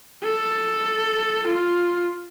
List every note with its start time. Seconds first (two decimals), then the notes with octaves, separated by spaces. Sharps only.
0.24 A4
1.47 F4